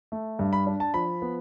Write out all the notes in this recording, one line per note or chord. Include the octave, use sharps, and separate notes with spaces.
A3
G2
B5
D4
A5
F3 B5
B3